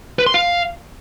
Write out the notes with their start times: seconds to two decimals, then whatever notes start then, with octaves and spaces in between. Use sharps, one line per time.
0.19 B4
0.26 C6
0.34 F5